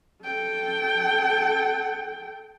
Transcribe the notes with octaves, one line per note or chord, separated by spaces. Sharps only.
A4 G5